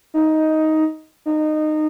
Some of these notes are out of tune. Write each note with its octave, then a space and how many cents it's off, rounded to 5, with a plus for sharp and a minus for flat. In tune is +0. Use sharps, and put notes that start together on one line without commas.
D#4 +10
D#4 -20